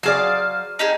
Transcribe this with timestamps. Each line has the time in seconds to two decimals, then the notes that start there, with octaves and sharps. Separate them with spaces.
0.03 F#3 G#4 C5 D5 F5
0.79 D#4 G4 G#4